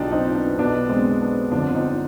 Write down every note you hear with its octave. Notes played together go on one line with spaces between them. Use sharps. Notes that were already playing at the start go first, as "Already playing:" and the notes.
Already playing: B1 B2 D4 D#4 F4 G4
C4 D#4
B3 D4
B1 B2 B3 D4
G#3 C4
B3 D4
G1 F2 D3 F3 D4 F4
C4 D#4